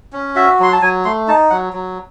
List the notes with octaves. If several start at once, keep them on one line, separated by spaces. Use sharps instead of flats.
C#4
F#4 E5
F#3 C6
A5
F#3 G#5
A3 C6
D#4 A5
F#3 F#5
F#3